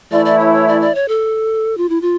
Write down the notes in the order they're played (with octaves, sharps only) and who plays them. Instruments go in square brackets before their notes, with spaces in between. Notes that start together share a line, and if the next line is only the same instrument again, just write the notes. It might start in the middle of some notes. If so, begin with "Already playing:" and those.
[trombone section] E3 A3 E4 [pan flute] D5
[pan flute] D5
C#5
C#5
D5
D5
C#5
A4
F4
E4
F4